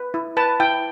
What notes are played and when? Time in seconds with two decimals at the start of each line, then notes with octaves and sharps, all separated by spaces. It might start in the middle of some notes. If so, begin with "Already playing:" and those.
Already playing: B4
0.14 E4
0.37 B4 A5
0.60 E4 G5